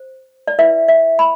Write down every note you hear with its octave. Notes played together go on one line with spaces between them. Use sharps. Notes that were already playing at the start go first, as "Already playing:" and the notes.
Already playing: C5
D5
E4 B4 E5
E5
B5